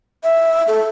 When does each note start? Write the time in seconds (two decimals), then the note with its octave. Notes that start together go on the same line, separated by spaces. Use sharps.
0.24 E5
0.68 A4